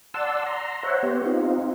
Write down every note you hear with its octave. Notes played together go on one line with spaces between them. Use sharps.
D5 F#5 A5 C6 E6
A#5 C6
C5 C#5 E5 F#5
B3 G4
C4 D#4 F4